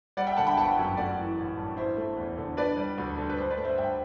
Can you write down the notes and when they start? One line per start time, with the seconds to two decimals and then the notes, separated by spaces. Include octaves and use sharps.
0.17 G3 D5 F#5
0.27 E5 G5
0.37 D3 F#5 A5
0.47 G5 B5
0.57 G1 F#5 A5
0.78 F#2
0.97 A3 D5 F#5
1.17 E3
1.38 A1
1.57 G2
1.77 E4 C5 E5
1.97 A3
2.17 E2
2.38 D3
2.57 D4 B4 D5
2.77 G3
2.98 D2
3.17 D3
3.30 B4
3.38 G2 C5
3.50 B4 D5
3.57 A3
3.64 C5 E5
3.78 G2 E5 G5